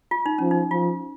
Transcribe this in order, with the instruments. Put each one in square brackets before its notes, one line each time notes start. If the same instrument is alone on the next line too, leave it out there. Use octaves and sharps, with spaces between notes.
[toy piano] F4
D#4
[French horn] F3 [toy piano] C#4
[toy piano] D#4
[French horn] F3 [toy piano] F4